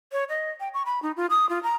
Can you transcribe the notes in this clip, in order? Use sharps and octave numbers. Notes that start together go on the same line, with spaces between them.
C#5
D#5
G5
C#6
B5
D#4
F4
D#6
F4
A#5